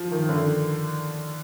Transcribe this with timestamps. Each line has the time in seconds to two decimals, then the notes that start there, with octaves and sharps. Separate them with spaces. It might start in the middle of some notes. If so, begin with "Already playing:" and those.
Already playing: F3
0.12 D#3
0.29 D3